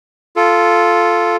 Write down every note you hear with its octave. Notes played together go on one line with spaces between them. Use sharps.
F4 A4